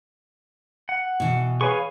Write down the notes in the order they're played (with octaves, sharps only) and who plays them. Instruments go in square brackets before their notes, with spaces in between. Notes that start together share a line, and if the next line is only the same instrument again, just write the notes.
[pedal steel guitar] F#5
[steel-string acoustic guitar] B2 E3
[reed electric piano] G#4 B4 C#5 [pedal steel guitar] F5 G#5 C#6